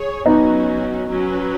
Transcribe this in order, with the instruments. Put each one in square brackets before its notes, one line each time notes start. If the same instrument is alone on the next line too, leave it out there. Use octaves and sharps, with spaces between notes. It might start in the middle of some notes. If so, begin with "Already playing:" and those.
Already playing: [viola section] G#4 C#5
[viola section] F#3 C#4 F#4 [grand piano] B3 D#4
[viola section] F#3 C#4 F#4 B4